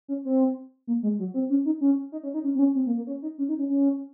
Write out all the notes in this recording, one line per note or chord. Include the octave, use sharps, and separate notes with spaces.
C#4
C4
A#3
G#3
F#3
C4
C#4
D#4
C#4
D#4
C#4
D#4
C#4
C4
C#4
C4
A#3
A#3
C#4
D#4
C#4
D#4
C#4
C#4